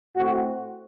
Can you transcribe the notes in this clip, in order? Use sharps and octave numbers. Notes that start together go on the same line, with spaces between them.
A2 A3 C4 F#4